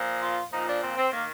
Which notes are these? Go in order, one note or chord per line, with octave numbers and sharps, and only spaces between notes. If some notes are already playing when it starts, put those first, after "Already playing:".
Already playing: A#2 F3
F4
A#2 F3 D#4
D4
C4
C4
D#3 A#3